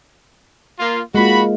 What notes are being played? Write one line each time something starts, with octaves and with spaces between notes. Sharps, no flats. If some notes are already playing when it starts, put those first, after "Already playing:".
A#3 F4
G#3 A#3 F4 F#4 B5